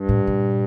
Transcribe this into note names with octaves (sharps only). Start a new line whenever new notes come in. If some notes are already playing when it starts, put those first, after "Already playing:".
Already playing: G2
A2
A#2